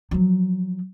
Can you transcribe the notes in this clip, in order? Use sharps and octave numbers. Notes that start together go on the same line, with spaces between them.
F3 F#3